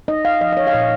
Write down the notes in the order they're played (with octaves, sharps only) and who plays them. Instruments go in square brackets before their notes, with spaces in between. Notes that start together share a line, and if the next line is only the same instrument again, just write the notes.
[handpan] D#4 D#5
F5
F3 D#5
D#5
C#5
F5
A#2 D#5